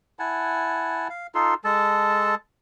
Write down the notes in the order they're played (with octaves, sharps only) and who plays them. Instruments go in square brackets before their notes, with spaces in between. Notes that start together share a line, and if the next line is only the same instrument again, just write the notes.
[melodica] E4 F#5 G#5 A5
F5
D#4 F4 A4 C6
G#3 A4 A5